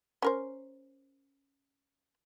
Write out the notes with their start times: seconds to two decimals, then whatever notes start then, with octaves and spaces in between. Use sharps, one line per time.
0.22 C#4 A#4 C5